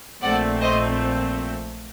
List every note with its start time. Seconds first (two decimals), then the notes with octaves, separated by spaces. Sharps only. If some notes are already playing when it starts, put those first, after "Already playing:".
0.21 A#1 A#2 A3 C4 D5 F#5
0.61 C5 D#5